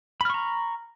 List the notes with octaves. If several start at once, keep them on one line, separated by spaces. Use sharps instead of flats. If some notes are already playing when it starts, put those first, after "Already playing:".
A#5 B5 C#6 F6